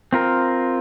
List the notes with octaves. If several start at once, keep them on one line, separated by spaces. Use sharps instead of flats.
C4 F4 A#4